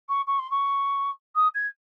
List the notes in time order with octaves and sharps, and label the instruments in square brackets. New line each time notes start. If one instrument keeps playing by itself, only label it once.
[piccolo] C#6
C#6
C6
C#6
D#6
G#6